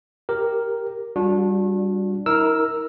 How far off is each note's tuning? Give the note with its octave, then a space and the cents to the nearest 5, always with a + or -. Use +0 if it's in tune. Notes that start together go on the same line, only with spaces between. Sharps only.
G4 +0 A#4 +0
G3 +0 D4 -10 F#4 -35
E4 -45 A#4 +0 E6 +0